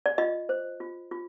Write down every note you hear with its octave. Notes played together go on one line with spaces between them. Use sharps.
D5
F4 D#5
C5
F4
F4